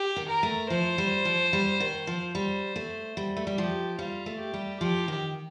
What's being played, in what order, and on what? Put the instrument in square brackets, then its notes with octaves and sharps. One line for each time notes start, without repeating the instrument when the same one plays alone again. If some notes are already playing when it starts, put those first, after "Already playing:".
Already playing: [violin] G4
[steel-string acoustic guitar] D#3
[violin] A#4
[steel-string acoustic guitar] A3
[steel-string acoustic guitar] F3 [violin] C5
[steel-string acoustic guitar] G3
F3
G3
D#3
F3
[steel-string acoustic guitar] G3 [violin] C5
[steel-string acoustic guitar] A3
G3
A3
G3
[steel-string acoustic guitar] F3 [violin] G4
[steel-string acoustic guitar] G3 [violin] F4
[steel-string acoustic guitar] A3
[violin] G4
[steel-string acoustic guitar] G3
[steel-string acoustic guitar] F3 [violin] G4
[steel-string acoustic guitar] D#3